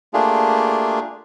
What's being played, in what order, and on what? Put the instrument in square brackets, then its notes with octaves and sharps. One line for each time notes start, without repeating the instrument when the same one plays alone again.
[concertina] A3 A#3 D4 F4 G4 G#4